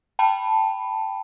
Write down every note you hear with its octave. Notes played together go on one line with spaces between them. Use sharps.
G5 A5 B5